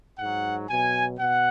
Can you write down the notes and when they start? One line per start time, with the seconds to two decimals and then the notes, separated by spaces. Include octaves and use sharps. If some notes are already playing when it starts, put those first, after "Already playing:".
0.16 G#2 F#3 F#5
0.68 B2 F#3 G#5
1.19 B2 F#5